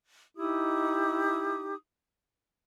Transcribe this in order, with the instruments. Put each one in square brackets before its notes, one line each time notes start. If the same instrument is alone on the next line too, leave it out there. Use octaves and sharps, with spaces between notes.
[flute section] D#4 G4 D#6 [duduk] E4